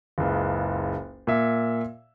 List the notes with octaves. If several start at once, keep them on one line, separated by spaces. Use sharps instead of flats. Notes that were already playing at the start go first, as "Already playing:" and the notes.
F#1 C#2
A#2 E5